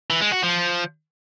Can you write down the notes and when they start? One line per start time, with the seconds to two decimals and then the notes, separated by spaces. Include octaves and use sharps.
0.10 E3
0.21 G#3
0.32 F#4
0.43 F3